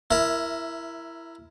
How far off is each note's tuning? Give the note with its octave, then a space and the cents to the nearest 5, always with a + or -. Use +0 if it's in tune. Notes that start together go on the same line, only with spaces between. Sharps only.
E4 +15 A#4 +0 E5 -10